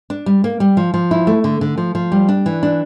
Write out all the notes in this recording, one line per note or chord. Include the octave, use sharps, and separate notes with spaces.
D4
G3
A#3
G3
F3
F3
E4
A3
D3
D3
F3
F3
G3
D4
E3
D4